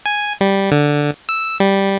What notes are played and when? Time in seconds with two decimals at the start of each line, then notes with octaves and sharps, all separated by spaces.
0.06 G#5
0.41 G3
0.72 D3
1.29 E6
1.60 G3